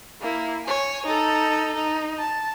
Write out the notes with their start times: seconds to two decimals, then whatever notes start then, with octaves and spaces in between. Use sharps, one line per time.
0.21 A#3 E4
0.64 C#5 G#5
1.06 D#4 A4
1.75 D#4
2.18 A5